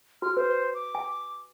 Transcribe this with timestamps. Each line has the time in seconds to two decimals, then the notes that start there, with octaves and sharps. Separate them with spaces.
0.22 F#4 F6
0.37 B4 C5
0.74 D6
0.95 G#5